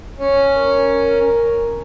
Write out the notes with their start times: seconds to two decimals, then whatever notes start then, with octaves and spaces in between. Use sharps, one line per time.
0.18 C#4
0.58 A#4